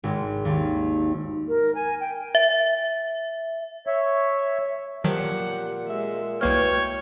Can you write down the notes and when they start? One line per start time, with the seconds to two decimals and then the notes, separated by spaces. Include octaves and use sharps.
0.03 G#1
0.45 D#2
1.48 A#4
1.75 G#5
2.00 G5
2.35 E5
3.87 C#5 E5
5.04 A#2 D#3 F3 F#3 G4 F#5
5.87 G#3 E5
6.41 C2 B2 A#3 E4 C#5 G5 F6